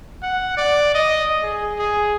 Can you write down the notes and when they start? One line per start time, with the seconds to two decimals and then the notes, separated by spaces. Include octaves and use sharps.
0.22 F#5
0.57 D5
0.95 D#5
1.43 G#4
1.79 G#4